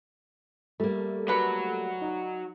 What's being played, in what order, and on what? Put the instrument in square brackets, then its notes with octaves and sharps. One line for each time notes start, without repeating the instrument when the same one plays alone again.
[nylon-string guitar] G3 A#3 [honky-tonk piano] A3
[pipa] D3 B4 [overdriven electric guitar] F#3
[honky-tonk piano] D#4